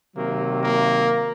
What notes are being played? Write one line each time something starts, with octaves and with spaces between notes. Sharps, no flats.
C3 D#3 F#3 A#3
A#3